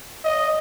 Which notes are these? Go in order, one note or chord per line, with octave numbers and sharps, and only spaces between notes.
D#5